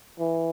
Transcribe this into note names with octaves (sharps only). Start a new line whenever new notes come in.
E3